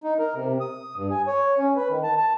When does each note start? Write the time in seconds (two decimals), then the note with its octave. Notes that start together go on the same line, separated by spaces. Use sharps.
0.04 D#4
0.19 A#4
0.35 C3
0.61 D#6
0.96 G2
1.11 G#5
1.27 C#5
1.58 C#4
1.76 B4
1.89 D#3
2.03 A5
2.17 A5